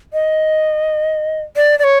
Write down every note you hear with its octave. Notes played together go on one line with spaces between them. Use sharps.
D#5
D5
D5
C#5